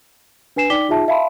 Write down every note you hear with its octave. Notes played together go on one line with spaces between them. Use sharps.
D4 B4 G#5 C7 E7
D#4 D5 G5 D6 B6 G7
D#4 F4 G#4 E5 A5
E5 F5 A5 B5 C6